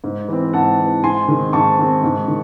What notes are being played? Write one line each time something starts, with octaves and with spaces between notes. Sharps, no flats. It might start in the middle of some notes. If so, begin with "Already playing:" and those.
G#2
E3 C4
G#2 F#5 A5
E3 C4
G#2 G#5 C6
D#3 G#3 C4
G#2 A5 C#6
D#3 G#3 C4
G#2
D#3